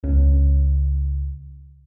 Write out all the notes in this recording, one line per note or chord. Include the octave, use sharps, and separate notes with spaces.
C#2 C#4